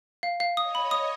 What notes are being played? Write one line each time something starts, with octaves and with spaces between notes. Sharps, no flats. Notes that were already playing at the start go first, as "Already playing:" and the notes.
F5
F5
C#5 D#5 D#6
B5
D#6